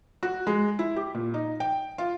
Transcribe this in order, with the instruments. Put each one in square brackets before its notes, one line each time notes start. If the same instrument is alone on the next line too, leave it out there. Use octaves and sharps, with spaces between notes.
[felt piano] F#4
G#3
E4
G4
A#2
D#4
G5
F4